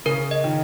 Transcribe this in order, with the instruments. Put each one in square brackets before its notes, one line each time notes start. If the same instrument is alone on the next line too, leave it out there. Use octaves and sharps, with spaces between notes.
[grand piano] C#3 [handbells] A#4
[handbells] D#5
[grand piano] D#3